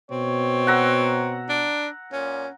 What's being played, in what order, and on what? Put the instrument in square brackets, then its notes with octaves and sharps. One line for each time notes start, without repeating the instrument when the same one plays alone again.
[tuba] B2 [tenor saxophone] C4 [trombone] C#5
[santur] F#5 A#5 E6
[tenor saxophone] D4
[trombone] A#2 [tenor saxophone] C#4